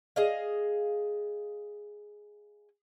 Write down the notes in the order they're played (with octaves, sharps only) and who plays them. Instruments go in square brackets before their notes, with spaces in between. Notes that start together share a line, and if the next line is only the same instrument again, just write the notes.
[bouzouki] G#4 D#5 F5